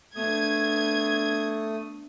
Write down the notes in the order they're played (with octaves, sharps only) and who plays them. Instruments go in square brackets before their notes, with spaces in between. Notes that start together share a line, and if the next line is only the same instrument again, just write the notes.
[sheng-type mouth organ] A3 D#6 [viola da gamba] B3 D4 [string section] G#6